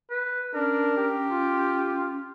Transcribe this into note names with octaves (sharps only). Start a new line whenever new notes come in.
B4
C#4 D4 A#4
G4
F4